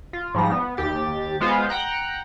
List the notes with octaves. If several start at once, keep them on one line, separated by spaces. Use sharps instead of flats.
F4
G#2 F3 G3 A#6
B3
D#2 G4 A6
G#3 B3 F4 C5 F5
F#5 G5 A#5 F#6